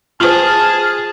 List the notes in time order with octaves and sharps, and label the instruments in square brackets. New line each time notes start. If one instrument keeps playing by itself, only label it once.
[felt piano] F4 C5 [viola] G#4 [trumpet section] A5 [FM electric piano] F6